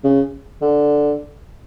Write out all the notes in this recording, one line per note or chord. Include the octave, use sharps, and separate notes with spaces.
C#3
D3